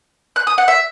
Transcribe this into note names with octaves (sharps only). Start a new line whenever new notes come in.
F#6
D#6
F#5
E5